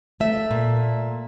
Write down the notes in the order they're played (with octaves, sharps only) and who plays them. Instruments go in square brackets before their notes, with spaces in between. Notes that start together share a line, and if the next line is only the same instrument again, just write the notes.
[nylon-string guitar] A3 E5
A#2